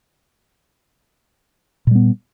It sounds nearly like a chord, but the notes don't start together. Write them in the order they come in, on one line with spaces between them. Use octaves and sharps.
A#2 G3 B3